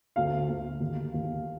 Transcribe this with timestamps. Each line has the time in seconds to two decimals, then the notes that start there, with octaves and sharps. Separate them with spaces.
0.16 D2 F5
0.49 D2
0.80 D#2
1.14 D#2